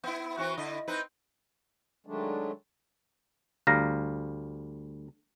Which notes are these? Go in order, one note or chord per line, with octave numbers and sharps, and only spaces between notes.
B3 E4
E3 C4 F#4
D3 E4 D#5
C4 D#4 B4
D#3 F#3 G#3 A3 D4
D2 G3 F5 A#5